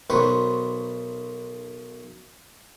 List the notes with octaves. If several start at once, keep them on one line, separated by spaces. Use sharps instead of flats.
B1 D#3 B4 C5 C6 C#6